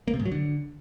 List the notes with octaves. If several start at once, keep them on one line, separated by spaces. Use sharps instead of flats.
A#3
C3
G#2
F#3
D3